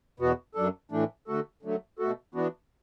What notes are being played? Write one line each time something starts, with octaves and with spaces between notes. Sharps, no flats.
E2 B2 B3 F#4
F#2 F#3 D4 A4
A2 E3 A3 D4
D3 A3 F#4 A4
D3 F#3 A3
B2 A3 F#4 A4
E3 B3 D4 F#4